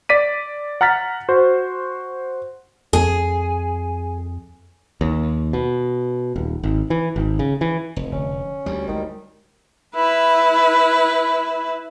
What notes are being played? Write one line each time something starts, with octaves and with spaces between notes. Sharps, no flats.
D5 B6 D#7
F#5 A#5 F6 A6 B6
F#4 C5
F2 G#4
D#2
B2
D#1
G#1
E3
G#1
C#3
E3
F1
D3 C#4
D2 G3
D#3 G#3 E4
E4 B4